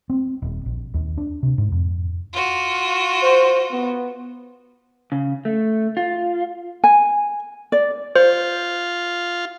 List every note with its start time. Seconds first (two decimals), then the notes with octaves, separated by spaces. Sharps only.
0.10 C4
0.42 D#1
0.66 A#1
0.94 D#2
1.17 D4
1.43 C3
1.58 G#2
1.72 F2
2.33 F4 F#4
3.23 C5
3.72 B3
5.12 C#3
5.45 A3
5.97 F4
6.84 G#5
7.72 D5
8.16 F4 C5